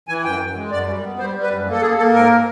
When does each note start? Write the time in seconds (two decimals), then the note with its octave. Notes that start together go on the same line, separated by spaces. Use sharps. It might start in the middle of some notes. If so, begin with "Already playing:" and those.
0.08 E3 G#5
0.24 F#2 G5
0.40 F#2
0.55 G#3
0.71 F#2 D5
0.87 G3
1.03 B3
1.19 G3 C5
1.35 G3
1.42 B4
1.50 F#2
1.66 A#3 A4
1.82 A#3 G#4
1.97 A#3 A4
2.13 G#2 A#4